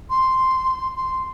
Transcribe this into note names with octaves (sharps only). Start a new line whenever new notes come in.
C6
C6